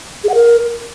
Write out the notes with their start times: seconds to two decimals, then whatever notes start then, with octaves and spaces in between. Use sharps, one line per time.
0.24 G#4
0.29 F#5
0.35 A#4